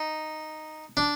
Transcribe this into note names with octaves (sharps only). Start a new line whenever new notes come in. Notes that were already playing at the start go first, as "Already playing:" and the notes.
Already playing: D#4
D4